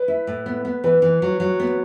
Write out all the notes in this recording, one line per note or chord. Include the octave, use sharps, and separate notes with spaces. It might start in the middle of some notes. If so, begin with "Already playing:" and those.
Already playing: B4
E4
A2
B3
B3
E3 B4
E3
F#3
F#3
B3